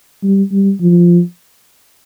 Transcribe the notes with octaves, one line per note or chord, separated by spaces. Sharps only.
G3
G3
F3